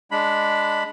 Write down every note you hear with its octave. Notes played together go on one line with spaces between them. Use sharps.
G#3 D4 B5